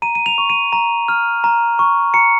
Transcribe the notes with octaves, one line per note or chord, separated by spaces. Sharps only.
A#5 D#7
D#7
F7
C#6
D#7
A#5
F6
A#5
C#6
A#5 C#7